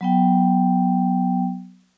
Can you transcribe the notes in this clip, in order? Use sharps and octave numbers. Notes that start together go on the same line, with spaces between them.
F#3 B3 G5